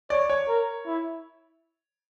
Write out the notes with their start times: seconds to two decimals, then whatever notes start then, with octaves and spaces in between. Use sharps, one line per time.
0.10 C#5 D5
0.30 C#5
0.48 A#4
0.86 E4